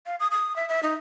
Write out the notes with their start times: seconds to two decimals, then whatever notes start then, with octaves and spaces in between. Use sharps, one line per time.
0.06 F5
0.20 D#6
0.31 D#6
0.56 E5
0.69 E5
0.83 D#4